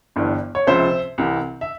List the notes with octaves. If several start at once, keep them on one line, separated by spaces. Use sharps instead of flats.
G1 G2 E3
C#5
C#2 C3 F3 C5 E5
C2 C3 E3
E5